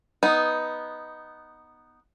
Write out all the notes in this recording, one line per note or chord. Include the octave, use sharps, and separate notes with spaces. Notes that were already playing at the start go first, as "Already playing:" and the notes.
B3 D#4